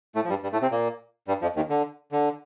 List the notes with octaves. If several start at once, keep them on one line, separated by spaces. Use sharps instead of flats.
A2 A3
F3
G2 G3
G2 G3
A2 A3
C3 C4
A#2 A#3
G2 G3
F2 F3
D#2 D#3
D3
D3